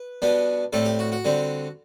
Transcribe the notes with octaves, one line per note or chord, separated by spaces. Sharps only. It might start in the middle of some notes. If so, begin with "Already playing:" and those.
Already playing: B4
B2 G3 B3 D4
A2 G3 C4 A4
G4
F#4
F#4
D3 G3 C4